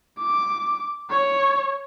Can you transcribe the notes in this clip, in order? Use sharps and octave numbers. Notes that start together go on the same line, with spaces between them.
D6
C#5